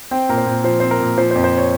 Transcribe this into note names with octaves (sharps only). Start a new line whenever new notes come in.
C4 G5
A#2 A#4
C5
A#2
F3 C5
C4 C5
A#4
A#2
F3 C5
C5
F2
C5
C#5